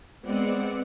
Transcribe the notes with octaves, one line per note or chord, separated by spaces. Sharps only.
G#3 B3 C4 D5 F#5